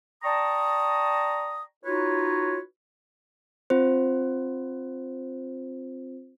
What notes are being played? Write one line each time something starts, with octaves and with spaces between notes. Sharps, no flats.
D5 G5 A5 A#5 C#6 D#6
D#4 F4 F#4 B4 C#5
C4 F4 C5